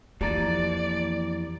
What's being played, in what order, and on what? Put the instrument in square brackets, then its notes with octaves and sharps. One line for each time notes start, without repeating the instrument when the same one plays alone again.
[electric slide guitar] F2 E3 [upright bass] A#3 [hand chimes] G4 A#5 A6 [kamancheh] D5